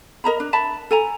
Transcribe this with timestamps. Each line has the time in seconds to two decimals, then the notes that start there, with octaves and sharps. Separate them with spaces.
0.24 A#4 D#5 A#5 B5
0.40 D4
0.53 E5 A5 B5
0.91 A4 G#5 A#5